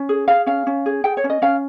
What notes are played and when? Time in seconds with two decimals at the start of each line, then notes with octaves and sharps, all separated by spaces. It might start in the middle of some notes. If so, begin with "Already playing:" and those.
Already playing: C#4
0.09 G#4
0.28 G#4 F5
0.46 C#4 F5
0.67 C#4
0.86 G#4
1.04 G#4 G5
1.17 C#5
1.24 C#4
1.30 D#5
1.42 C#4 F5